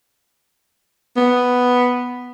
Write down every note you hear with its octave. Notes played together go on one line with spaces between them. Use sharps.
B3